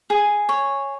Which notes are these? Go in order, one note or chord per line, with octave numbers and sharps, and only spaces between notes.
G#4
C#5